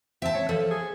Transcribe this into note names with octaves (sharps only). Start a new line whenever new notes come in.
C4 E5 A5
C#5
F3 A4
G#4